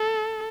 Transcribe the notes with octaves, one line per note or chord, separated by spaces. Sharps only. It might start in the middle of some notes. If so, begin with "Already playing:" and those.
Already playing: A4